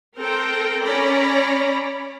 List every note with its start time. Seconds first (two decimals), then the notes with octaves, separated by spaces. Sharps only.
0.17 C4 A4 A#4 C5 G5
0.85 C#4 C#5 D5 A#5 B5